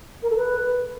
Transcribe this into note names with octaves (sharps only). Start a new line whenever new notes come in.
A#4
A4
B4